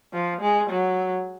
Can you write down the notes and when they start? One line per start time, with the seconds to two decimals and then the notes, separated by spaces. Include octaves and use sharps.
0.13 F3
0.41 G#3
0.70 F#3